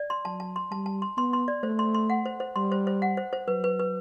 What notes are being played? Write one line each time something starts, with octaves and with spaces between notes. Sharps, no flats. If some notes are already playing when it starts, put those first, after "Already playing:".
Already playing: D5
C6
F#3 A5
A5
C6
G3 A5
A5
C6
B3 C6
C6
D5
A3 C5
C6
C6
F#5
C5
C5
G3 C6
C5
C5
F#5
C5
C5
F#3 B4
B4
B4